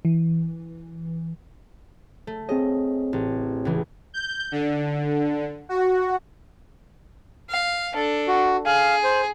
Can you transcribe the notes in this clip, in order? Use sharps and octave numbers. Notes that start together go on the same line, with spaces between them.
E3
A3
C4 G#4 C#5 D#5
A1
C#2 E3
G6
D3
F#4
F5
D4 A4
F#4
G#4 F5
C5